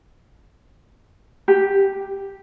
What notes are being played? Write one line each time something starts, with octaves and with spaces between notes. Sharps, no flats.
G4